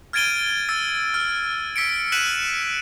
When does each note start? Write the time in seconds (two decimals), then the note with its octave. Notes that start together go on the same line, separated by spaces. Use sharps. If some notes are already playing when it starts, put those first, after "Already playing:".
0.13 F6 G#6 A6 D7 D#7 G7
0.69 E6 A6
1.14 F6
1.76 E6 B6 C#7 D7
2.12 F#6 B6 C#7 D#7 E7 F#7